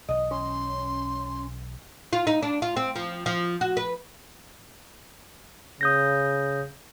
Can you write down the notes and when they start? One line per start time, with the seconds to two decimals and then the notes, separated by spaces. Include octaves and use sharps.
0.09 B1 E3 D#5
0.31 C#4 C6
2.13 F4
2.27 D#4
2.43 D4
2.62 F4
2.77 C4
2.96 F3
3.26 F3
3.61 F#4
3.77 B4
5.81 C#3 D#6 G6 A#6